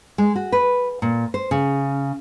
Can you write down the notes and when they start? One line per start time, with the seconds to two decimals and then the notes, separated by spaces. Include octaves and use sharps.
0.18 G#3
0.36 F#4
0.52 B4
1.02 A#2
1.34 C5
1.51 C#3